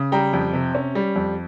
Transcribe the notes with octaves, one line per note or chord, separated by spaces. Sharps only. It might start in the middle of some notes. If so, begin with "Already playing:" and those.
Already playing: C#3
G3 G5 A#5
F2
C3
C#4
G3
F2